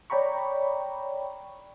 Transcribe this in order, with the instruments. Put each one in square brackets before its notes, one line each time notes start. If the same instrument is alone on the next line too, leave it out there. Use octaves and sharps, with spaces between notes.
[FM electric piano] C#5 D5 G5 A#5 B5 C#6